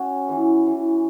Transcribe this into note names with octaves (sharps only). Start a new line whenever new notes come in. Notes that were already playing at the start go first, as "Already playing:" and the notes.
Already playing: C#4 F#4
E3
E3